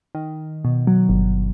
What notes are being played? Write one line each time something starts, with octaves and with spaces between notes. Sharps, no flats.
D#3
B2
F#3
G1